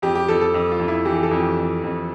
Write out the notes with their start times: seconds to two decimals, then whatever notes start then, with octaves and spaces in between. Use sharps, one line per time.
0.02 F2 G4
0.15 G4
0.28 F2 A4
0.41 A4
0.54 F2
0.71 F4
0.80 F2
0.88 E4
1.05 E3 G4
1.16 G4
1.23 A4
1.31 F2
1.39 G4
1.58 F2
1.83 F2